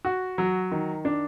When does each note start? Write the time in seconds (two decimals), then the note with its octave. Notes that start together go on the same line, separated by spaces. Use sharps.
0.05 F#4
0.38 F#3
0.72 D#3
1.05 D4